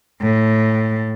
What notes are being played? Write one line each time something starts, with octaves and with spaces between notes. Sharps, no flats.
A2